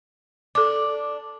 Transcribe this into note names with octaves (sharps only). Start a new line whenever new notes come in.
D4 A4 D6